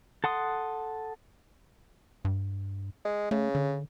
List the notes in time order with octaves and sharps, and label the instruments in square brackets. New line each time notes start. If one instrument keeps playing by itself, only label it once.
[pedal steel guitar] A4 F#5 C6 D#6
[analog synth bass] G2
[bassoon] G#3
[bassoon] C#3 [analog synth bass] A3
[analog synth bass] D3